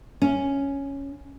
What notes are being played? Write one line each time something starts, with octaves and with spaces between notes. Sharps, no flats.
C#4